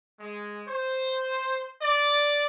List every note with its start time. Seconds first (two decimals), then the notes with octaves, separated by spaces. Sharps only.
0.18 G#3
0.67 C5
1.82 D5